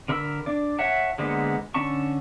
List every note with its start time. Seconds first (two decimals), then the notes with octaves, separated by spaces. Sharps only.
0.08 D3 A#4 B5 E6
0.46 D4 D5
0.79 C#5 E5 F#5 A5
1.18 D3 G#3 A#3 B3 C5
1.74 D3 C#4 A5 C#6